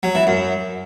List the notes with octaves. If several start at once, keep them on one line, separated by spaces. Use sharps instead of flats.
F#3
E3
F#2